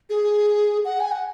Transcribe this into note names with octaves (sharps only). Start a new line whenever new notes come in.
G#4
F#5
G#5
F#5